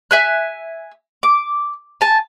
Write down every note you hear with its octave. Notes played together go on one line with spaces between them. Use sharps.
E5 G#5 F#6
D6
G#5 A5